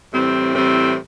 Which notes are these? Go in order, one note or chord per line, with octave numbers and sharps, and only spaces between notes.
A2 E3 G3 C4
A2 E3 G3 C4